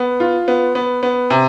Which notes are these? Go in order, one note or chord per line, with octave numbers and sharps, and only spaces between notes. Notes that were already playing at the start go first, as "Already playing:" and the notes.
Already playing: B3
F4
B3
B3
B3
C3